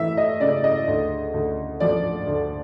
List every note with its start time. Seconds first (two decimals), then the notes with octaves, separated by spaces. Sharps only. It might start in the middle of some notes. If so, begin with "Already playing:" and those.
Already playing: E3 A3 E5
0.17 D#5
0.40 C#3 D5
0.64 D#5
0.88 D2
1.34 D2
1.80 F3 D5
2.27 D2